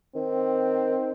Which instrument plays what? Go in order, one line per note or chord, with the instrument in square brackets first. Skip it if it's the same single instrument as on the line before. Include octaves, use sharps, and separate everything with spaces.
[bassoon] D#3 [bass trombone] C4